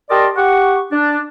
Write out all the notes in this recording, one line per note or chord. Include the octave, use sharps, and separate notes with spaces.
G4 A#4 D5 D#5 A5 C6
G4 F#5 C#6
D4